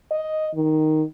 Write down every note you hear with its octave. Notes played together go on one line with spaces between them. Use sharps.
D#5
D#3